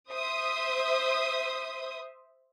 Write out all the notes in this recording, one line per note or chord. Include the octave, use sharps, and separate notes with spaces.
C5 E5 D#6